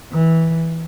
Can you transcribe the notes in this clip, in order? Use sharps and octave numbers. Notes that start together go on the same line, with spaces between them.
E3